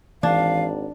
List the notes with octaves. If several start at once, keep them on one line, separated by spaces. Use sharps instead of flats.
G#1 E3 D4 F5